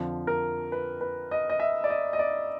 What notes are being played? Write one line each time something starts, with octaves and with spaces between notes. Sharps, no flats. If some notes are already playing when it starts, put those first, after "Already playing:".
Already playing: F2 D3 F3
A#4
B4
B4
D#5
D#5
E5
D5
D#5
D#5
D5